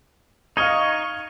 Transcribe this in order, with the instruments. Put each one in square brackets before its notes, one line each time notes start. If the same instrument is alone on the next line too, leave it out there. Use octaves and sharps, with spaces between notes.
[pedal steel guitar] D#4 D#5 [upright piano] F5 F6 G#6 [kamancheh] C#6